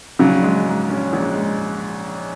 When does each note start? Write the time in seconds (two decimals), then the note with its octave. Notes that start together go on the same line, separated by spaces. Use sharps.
0.19 A#1 C#3 F#3
0.43 G#3
0.66 G#2
0.89 C#4
1.13 A#1
1.36 G#3